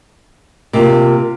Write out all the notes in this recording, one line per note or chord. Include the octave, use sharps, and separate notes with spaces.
C3 A#3 F4